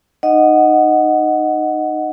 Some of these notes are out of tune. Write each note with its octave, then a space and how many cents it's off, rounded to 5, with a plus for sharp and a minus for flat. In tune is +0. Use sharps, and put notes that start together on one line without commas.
D#4 -25 D#5 +0 F#5 +0